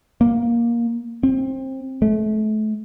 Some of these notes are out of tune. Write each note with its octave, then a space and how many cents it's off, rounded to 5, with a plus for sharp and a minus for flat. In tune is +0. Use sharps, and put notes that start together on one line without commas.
A#3 +10
C4 +20
A3 -35